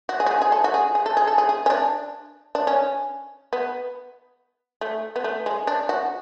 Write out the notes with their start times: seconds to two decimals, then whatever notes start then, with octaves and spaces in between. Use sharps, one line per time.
0.09 F#4
0.20 G#4
0.26 F#4
0.31 G#4
0.42 G#4
0.52 A4
0.64 F#4
0.74 G#4
0.95 G#4
1.06 A4
1.17 G#4
1.27 A4
1.38 G#4
1.49 G#4
1.66 C#4
1.70 D4
2.55 D4
2.67 C#4
3.53 B3
4.81 A3
5.16 B3
5.24 A3
5.46 G#3
5.67 D4
5.89 F#4